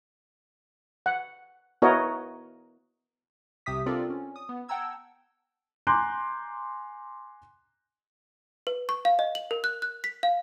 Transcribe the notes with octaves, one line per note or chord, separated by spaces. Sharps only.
F#5
B3 E4 F#4 A#4 C#5 D#5
C2 C3 G4 E5 D#6 B6
C4 D4 F4 A4 A#4 D5
C#4
D#6
B3
F#5 G5 A5 A#5 E6 G#6
G#5 A#5 C6 D6 F#6 G6
B4
C#6
F5
D#5
F#7
A#4
F#6
F#6
B6
F5